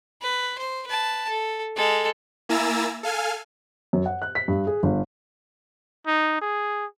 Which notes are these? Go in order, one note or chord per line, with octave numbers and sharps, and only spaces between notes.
B4
C5
B4 A5
A4
G#3 A4
A#3 E4 G#5 A#5 E6 A6
A4 F5 G#5 F6
F#2
F#5
F#6
B6
G2
G#4
G1
D#4
G#4